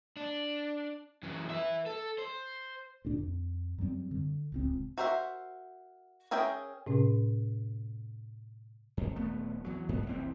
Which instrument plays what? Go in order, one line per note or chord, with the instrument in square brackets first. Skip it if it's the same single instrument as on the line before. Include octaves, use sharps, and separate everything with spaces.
[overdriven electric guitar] D4
F#2 E3
B4 E5
A4
C5
[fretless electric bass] D2 A#2 D4
F2
F#2 F#3 G3 C4
D3
D1 C#2 C4
[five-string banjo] F#4 A#4 C5 D#5 E5
C#4 G#4 A#4 E5 G5
[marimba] A2 C3 C#4
[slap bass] F2
D#1 A3 B3
E2 F#3
A#1 G2 B3
F1 B1 E3 C4